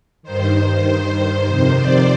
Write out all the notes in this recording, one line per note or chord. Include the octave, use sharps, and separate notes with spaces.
G2 D#3 C5
G2 D#3 C5
F2 C3 D#3
D5